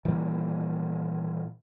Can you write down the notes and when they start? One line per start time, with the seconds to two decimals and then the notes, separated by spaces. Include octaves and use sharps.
0.05 A#2 D#3 E3 G3